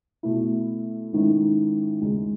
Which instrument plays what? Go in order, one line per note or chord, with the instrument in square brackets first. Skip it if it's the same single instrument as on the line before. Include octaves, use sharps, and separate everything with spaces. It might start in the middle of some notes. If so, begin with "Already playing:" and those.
[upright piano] B2 A3 E4
G#2 D#3 G#3 C#4 E4
D#2 C#3 G#3 D#4